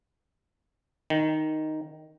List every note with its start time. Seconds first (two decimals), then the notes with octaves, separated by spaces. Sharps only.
1.10 D#3